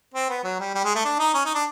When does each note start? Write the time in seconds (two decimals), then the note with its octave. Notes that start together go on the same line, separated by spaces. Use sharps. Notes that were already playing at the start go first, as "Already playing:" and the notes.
0.14 C4
0.29 B3
0.44 F#3
0.60 G3
0.74 G3
0.85 G#3
0.95 A3
1.05 D4
1.19 D#4
1.34 C#4
1.45 D#4
1.55 D4